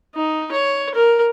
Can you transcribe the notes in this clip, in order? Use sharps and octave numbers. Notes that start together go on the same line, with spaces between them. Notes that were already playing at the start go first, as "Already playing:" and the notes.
D#4
C#5
A#4